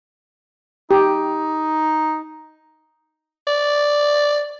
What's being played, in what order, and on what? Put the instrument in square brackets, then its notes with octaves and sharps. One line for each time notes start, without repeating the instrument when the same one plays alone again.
[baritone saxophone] D#4 [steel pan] G4
[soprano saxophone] D5